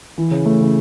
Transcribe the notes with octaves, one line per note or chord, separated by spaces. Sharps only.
E3
C#3
A3
C#3